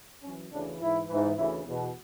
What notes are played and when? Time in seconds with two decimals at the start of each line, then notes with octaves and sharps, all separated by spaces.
0.23 F#2 E3 C#4
0.52 D2 C#3 E3 D4
0.81 G#2 E3 E4
1.08 G#2 E3
1.36 D2 C#3 E3 E4
1.65 E2 B2